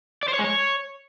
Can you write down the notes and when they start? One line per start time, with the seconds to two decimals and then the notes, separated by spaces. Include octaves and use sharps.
0.23 D5
0.28 C5
0.34 C#5
0.39 G#3
0.44 C#5